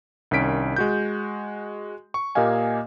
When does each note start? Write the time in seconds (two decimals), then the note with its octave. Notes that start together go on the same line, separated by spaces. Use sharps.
0.31 C2 D#3 C#4 B6 D7
0.76 G#3 F#4 G6
2.14 C#6
2.35 A#2 A#3 G4 D#5 F5 G#5